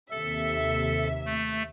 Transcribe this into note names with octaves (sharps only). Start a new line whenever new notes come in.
D#2 C3 A4 E5
A3